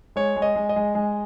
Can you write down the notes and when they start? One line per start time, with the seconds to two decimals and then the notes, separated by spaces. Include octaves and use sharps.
0.16 G#3 C#5
0.36 G#3
0.42 D#5
0.56 G#3
0.69 D#5
0.76 G#3
0.95 G#3